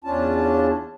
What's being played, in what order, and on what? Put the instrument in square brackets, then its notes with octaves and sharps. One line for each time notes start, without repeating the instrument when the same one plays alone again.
[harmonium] E2 C#4 D4 F4 A5